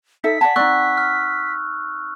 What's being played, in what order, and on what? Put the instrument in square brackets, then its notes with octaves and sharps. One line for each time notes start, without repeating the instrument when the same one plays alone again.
[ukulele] D#4 A4 E5 [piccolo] B6
[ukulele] D5 A5 [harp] F#5 G#5
[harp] C4 D#4 [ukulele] D5 [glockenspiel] C#6 E6 F#6
[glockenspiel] F6